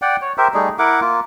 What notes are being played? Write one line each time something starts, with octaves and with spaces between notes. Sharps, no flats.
D5 F#5 G5
C#5
G4 A#4 C5 E5
G3 A3 D#4 G#4
E4 A#4 F#5 D6
A#3 F4